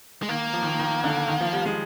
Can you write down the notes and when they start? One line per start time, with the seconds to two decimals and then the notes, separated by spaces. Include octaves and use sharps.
0.23 G#3
0.29 D#3 A#3
0.53 F3
0.63 D#3
0.79 D#3
1.04 D3
1.28 D#3
1.41 F3
1.53 G3
1.66 G#3